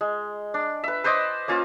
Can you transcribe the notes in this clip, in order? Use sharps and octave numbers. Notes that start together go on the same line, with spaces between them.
G#3
D4
B4 E5
B4 C5 D5 D#5
A#3 C#4 F4